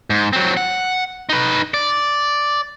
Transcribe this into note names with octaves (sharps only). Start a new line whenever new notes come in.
G#2
F#3 C4
F#5
D#4 B4
D5